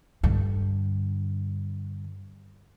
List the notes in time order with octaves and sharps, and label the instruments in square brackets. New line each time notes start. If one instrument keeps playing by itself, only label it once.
[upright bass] G2 D3